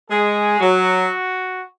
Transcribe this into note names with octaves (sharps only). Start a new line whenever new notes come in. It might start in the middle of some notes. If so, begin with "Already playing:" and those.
G#3 G#4
F#3 F#4